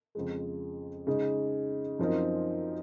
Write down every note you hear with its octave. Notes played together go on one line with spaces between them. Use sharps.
F2 C#3 F3 G#3
C#3 G#3 D#4
F#2 F3 C4 D#4 A#4